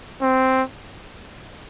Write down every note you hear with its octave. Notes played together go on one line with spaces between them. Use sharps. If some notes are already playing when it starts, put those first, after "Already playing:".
C4